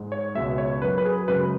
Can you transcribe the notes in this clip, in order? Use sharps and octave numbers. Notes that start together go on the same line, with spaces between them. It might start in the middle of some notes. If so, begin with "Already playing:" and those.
Already playing: G#2 G#3
C#5
C#2 B2 G#3 E5
C#5
F#2 F#3 B4
B4
G#4
F#2 C#3 G#3 B4